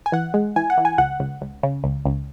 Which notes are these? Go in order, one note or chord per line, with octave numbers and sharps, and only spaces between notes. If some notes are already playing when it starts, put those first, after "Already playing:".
G#5
E3 F#5
G#3
E3 G#5
F#5
E3
G#5
C#2 F#5
C#2
C#2
C#3
C#2
C#2